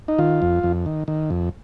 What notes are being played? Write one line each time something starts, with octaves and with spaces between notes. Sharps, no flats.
D#4
D#3 F4
F2
F2
D#3
D#3
F2